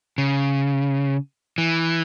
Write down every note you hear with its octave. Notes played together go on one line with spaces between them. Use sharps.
C#3
E3